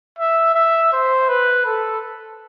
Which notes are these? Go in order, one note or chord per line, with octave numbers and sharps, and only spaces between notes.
E5
E5
C5
B4
A4